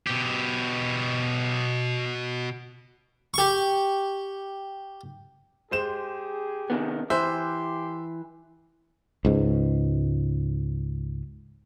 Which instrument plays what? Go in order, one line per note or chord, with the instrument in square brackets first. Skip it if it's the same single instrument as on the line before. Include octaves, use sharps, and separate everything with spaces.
[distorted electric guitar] B2 G4
[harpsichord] G4 C#6
[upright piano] G#3 C5 E7 [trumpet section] G4 G#4
[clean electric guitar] C3 D#3 B3
[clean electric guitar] E3 [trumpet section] G4 C6 D6 [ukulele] C5 [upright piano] E5
[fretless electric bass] C#2 G#2